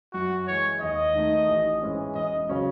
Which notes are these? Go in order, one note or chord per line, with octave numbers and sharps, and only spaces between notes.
F#2 F#4
E3 G#3 C#5
D#2 D#5
D#3 A3 D#4
A1
G#2 E3 G#3 C#4
E1 D#5
C#3 F#3 C#4